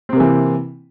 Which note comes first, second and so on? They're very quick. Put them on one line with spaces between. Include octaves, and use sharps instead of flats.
C4 C3 A#3 E3